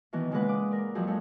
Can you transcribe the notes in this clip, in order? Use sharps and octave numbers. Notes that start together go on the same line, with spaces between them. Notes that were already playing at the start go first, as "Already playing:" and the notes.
B2 D#3 E3 B3
A#2 C#3 E3 G#3 B4 F#5
D6 D#6
A#4 D5
F2 F3 F#3 G#4
F3 G#3 D#4 G#4 A4 C#5